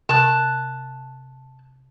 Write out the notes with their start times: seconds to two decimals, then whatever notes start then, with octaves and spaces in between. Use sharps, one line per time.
0.09 C3 A5 F#6